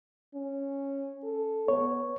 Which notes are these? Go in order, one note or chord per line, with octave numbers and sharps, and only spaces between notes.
C#4
A4
B3 C#5